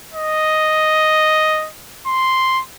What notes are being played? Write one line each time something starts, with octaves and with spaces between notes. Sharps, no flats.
D#5
C6